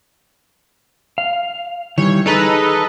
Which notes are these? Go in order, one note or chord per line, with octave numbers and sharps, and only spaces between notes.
F5
D#3 E3 G3 C#5
D#4 G#4 A4 B4 D#5 A#5